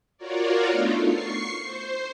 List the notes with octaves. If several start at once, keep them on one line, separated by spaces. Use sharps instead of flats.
F4 F#4 A#4 C#5 D5
A3 B3 D4 D#4 F4 A4
C#6 C7
C5